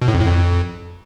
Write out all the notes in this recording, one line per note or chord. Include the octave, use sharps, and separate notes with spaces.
B2
A2
F2
A2
F2